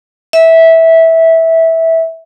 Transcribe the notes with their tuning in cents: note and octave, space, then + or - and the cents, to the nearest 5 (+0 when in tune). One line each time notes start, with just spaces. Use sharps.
E5 -15